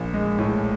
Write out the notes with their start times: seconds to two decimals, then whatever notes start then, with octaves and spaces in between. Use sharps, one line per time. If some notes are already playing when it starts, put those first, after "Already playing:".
Already playing: A#1 A#3
0.13 G#3
0.39 A2